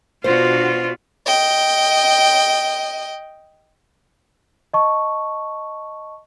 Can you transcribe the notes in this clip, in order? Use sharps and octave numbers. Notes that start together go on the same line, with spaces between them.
B2 D4 F4 F#4 C5
D#5 G5
D#5 A5 C#6